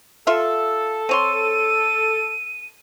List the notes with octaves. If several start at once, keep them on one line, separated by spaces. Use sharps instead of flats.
F4 A4 E5
C4 C#5 C6 D#7